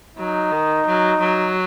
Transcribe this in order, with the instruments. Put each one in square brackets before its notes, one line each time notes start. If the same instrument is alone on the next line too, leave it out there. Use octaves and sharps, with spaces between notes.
[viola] F#3 [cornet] D#4
[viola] D#3
F#3
F#3